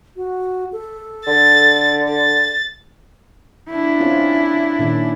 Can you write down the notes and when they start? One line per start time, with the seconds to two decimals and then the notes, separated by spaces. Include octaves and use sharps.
0.16 F#4
0.72 A4
1.27 D3 A6
2.09 A6
3.70 D4 E4
4.00 C4 C#4 F4
4.79 A#2 D#3 C#4